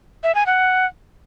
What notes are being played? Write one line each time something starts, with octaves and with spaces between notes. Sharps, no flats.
E5
G#5
F#5